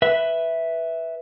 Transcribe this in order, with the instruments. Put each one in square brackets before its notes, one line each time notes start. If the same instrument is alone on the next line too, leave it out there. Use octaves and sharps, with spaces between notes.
[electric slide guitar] B4 E5